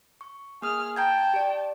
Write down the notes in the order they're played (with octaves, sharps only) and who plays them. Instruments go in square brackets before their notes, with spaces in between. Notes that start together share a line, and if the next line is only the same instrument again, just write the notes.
[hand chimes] C#6
[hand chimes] A#3 D#6 [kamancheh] G#4 F6
[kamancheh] G5 A5 [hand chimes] A#5 G6 G#6
[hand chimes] G4 D5